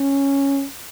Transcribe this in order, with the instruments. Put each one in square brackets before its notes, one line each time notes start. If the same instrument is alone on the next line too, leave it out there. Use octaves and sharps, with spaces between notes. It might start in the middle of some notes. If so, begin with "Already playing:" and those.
Already playing: [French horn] C#4